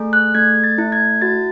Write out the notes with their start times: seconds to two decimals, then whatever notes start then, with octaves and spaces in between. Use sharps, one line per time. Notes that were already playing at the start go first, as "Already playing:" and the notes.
Already playing: A3 G#4
0.13 F#6
0.35 A3 G#6
0.64 A6
0.78 E4
0.92 G#6
1.22 F#4 A6